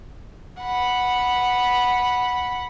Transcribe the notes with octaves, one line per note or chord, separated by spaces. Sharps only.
F#5 B5